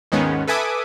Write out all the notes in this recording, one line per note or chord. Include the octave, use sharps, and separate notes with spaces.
D#2 G#2 D#3 G#3 B3 C#4
A4 B4 E5 G#5 D6 D#6